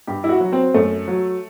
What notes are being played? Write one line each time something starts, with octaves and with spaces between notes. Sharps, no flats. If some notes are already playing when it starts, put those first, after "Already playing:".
G2 G4
E4
F#4
F#3
C4
F#2 A3
F#3